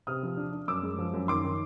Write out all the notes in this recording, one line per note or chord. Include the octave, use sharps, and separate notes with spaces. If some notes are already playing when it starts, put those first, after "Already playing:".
C3 D#6 F6
F3
D4
D4
F#2 D6 E6
G#3
F3
F#2
D#3 C6 D6
D#3